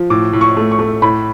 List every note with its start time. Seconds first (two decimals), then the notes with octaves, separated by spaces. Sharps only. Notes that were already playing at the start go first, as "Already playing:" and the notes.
Already playing: F3
0.10 A2 D6
0.33 A2
0.41 C#6
0.57 A3
0.72 C#6
0.79 A3
1.02 A2 B5